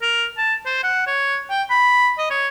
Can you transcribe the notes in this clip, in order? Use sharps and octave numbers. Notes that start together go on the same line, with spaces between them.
A#4
A5
C5
F#5
C#5
G5
B5
D#5
C#5